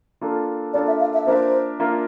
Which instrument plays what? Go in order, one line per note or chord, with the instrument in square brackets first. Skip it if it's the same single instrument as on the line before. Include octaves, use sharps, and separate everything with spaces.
[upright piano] A#3 D4 F4 A4
[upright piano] A#3 D4 F4 A4 [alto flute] D5
[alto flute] E5
F5
E5
[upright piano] A#3 D4 F4 A#4 E5 [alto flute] C5
[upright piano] A#3 D4 F4 A#4 E5